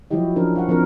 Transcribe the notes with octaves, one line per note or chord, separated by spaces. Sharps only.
F3 F#3 E4 F#4 G4 D#5
F3 C#4 D4 A#4
F#4 F5 F#5
F3 C4 D4 A#4